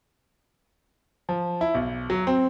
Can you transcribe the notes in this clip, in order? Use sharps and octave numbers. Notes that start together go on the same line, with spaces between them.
F3
E4
B1
F#3
C4